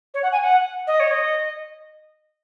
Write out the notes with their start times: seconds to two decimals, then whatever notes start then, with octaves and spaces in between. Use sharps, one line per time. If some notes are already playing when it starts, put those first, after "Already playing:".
0.14 C#5
0.23 F#5
0.32 G#5
0.42 F#5
0.87 D#5
1.00 C#5
1.11 D#5